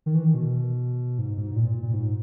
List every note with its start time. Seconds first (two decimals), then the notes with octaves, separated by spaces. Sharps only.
0.06 D#3
0.15 E3
0.24 D#3
0.34 B2
1.18 G#2
1.37 G#2
1.51 G#2
1.56 A#2
1.83 A#2
1.93 G#2